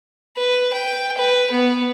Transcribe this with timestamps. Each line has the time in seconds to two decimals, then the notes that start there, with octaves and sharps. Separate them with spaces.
0.36 B4
0.73 G5
1.17 B4
1.51 B3